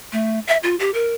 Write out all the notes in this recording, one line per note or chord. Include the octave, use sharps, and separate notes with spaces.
A3
E5
F4
G4
A#4